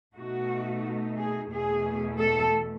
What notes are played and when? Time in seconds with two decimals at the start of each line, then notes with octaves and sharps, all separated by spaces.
0.14 B2 A3 D#4 F#4
1.18 G#4
1.51 E2 B2 A3 G#4
2.20 A4